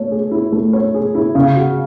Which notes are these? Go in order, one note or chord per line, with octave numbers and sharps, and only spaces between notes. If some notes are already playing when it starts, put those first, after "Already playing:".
Already playing: A3 C#5
G#4
E4
A3
C#5
G#4
E4
C#3
F#4